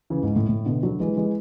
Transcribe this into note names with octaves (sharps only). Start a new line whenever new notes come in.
C#3 E3
G#2
A2
A2
B2 D3
D3 F#3
E3 G#3
E3 G#3